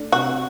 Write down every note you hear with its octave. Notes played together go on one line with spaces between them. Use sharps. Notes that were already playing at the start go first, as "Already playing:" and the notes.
Already playing: A3 D4
C3 F#4